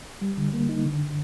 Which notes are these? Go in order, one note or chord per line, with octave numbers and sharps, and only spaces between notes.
G3
D3
A#3
D#4
D3